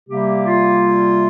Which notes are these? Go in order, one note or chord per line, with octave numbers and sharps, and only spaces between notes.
C3 G3 A#3 G4
F4